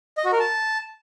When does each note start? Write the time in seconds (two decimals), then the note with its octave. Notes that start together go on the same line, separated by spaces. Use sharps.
0.18 D#5
0.25 F#4
0.32 A#4
0.40 A5